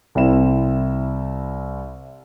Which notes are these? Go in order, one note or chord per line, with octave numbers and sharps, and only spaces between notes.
C2 C4 E4 E7